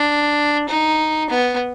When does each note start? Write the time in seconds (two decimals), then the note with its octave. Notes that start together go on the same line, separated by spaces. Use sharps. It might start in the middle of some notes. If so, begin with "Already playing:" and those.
Already playing: D4
0.68 D#4
1.29 B3